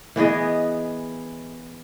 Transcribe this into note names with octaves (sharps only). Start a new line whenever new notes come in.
E3 B3 G#4 D#5